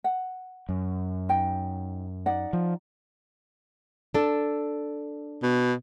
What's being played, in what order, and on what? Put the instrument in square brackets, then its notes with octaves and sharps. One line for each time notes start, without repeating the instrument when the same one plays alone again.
[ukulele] F#5
[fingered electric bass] F#2
[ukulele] D#4 G5
D#4 D5 F#5
[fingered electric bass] F3
[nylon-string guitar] D4 A4
[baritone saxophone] B2